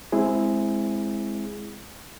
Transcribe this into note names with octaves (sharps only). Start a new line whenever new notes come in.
G#3 C4 E4 G#4